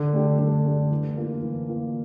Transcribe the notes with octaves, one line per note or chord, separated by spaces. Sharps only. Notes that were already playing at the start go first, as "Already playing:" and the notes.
Already playing: D3
A3 D4 G4
D3
A3 D4 G4
E3
A#3 F4
E3
A#3 F4